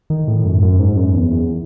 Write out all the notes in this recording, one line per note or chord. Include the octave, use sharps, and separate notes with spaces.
D#3
A2
F#2
F#2
G#2
F#2
E2
E2